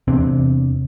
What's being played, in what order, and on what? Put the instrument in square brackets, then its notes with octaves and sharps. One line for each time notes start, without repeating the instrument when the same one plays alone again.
[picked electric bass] E2 C3 C4 D4